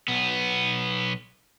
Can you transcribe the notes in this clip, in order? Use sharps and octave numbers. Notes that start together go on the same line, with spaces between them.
B1 B3